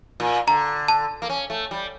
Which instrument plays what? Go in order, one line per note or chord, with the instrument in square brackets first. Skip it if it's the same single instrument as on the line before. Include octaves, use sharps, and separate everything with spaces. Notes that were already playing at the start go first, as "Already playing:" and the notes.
[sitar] A#2
[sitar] D3 [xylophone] A#5
[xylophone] A5
[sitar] A#3
C#4
A3
G3